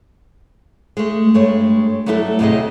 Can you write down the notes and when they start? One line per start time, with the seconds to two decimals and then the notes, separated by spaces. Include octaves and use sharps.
0.97 G#3 A3
1.34 G2 G#3 A3 C#5
2.06 F#3 G3 A3 B3 E4 A4
2.39 D2 A2 C3 E4 G#4 D#5